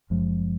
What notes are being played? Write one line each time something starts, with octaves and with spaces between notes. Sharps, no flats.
F#1 F#2 F3 G#3